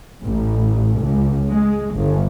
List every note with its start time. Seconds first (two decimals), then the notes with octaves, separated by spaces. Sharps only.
0.23 A1
1.00 C#2
1.50 G#3
1.93 G1